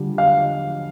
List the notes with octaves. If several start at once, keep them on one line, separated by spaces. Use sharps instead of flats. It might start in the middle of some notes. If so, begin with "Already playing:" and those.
Already playing: D3 G3 D4 F4
F5